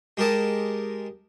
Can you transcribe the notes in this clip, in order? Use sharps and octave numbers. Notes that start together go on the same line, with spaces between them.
G#3 G4 A#4 A5 D#6